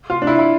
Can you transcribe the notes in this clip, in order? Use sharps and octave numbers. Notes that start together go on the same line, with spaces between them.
F4
D4
E4
E4